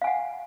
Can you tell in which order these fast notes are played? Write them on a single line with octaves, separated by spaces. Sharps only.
F5 G#5 F#5